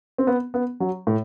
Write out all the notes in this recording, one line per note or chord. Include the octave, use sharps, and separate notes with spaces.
C4
B3
B3
F#3
A2